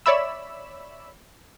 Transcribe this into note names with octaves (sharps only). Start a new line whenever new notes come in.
C#5 D5 E5 B5 E6